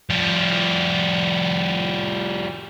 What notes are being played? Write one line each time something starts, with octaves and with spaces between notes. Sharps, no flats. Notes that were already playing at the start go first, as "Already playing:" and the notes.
F3 G3